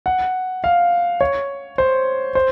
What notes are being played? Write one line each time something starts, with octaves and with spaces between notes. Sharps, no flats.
F#5
F5
C#5
C5
C5